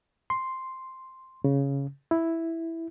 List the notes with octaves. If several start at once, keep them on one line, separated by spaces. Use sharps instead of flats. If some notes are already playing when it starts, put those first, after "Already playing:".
C6
C#3
E4